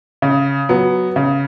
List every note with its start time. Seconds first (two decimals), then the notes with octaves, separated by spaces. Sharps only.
0.22 C#3
0.69 F#3 B3
1.16 C#3